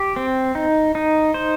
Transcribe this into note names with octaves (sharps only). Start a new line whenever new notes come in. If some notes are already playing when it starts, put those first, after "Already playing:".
Already playing: G4
C4
D#4
D#4
C5